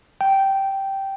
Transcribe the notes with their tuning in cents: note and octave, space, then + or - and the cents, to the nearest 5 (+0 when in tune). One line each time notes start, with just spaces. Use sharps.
G5 -10